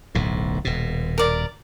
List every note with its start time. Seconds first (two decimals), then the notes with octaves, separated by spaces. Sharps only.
0.15 D1 B1 A2
0.65 D#1 B2
1.18 A#4 D5